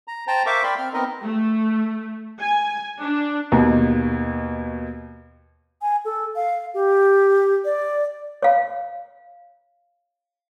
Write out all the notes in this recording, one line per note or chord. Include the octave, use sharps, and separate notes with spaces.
A#5
C5 G5 A5 A#5
A#4 C5 E5 F5 C#6 D6
A#4 D5 G5 B5 C6
C4 F6
B3 C4 D#4 A#4 D#5
A3
G#5
D4
D#2 B2
G#5
A4
F5
G4
D5
C#5 F5